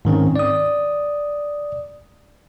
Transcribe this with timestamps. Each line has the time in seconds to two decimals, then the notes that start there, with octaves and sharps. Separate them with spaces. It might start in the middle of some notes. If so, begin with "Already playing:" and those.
0.05 G#2 D#3 C4 C#4
0.36 D5 D#6